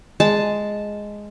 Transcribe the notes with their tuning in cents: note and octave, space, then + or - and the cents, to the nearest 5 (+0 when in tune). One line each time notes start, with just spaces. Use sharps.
G#3 +0 A5 +0